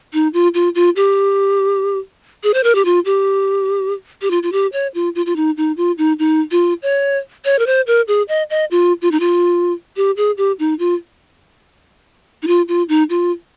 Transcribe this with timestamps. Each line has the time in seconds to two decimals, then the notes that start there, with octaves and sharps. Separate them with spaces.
0.13 D#4
0.34 F4
0.54 F4
0.75 F4
0.96 G4
2.43 G#4
2.54 C5
2.64 A#4
2.75 G4
2.85 F4
3.05 G4
4.22 G4
4.31 F4
4.43 F4
4.52 G4
4.73 C#5
4.95 F4
5.15 F4
5.26 F4
5.36 D#4
5.57 D#4
5.77 F4
5.98 D#4
6.19 D#4
6.51 F4
6.82 C#5
7.45 C#5
7.59 A#4
7.66 C5
7.87 A#4
8.08 G#4
8.28 D#5
8.50 D#5
8.71 F4
9.02 F4
9.12 D#4
9.20 F4
9.97 G4
10.17 G#4
10.37 G4
10.59 D#4
10.79 F4
12.43 D#4
12.47 F4
12.68 F4
12.89 D#4
13.10 F4